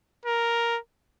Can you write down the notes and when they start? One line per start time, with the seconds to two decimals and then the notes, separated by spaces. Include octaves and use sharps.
0.25 A#4